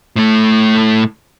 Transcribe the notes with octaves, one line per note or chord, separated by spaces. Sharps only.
A2 A3